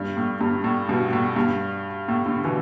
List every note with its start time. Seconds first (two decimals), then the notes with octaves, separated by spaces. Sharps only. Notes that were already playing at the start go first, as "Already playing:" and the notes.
Already playing: G2
0.17 A2
0.41 G2
0.64 A2
0.89 G2 B2
1.13 A2
1.36 G2
2.08 A2
2.26 A2 D3
2.44 B2 E3